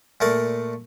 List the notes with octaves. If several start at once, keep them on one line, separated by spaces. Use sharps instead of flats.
A#2 A3 A#4 D5